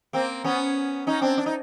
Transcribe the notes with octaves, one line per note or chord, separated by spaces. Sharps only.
A#3 C4
B3 C#4
C#4 D#4
C4 D4
D4
D#4